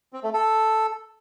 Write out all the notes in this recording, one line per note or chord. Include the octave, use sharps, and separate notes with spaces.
C4
A3
A4